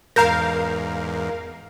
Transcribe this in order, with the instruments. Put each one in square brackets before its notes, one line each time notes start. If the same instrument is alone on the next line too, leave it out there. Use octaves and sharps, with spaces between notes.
[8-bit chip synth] E2 G#2 [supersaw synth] A#4 F5 [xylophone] A#5 G6 A#6